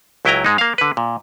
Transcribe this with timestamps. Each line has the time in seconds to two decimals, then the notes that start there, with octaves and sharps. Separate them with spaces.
0.25 C#2 F#3 E4 G5 G#5 A#5
0.44 G#2 G#3 D#4
0.58 A#3 F5
0.78 D3 B4
0.97 A#2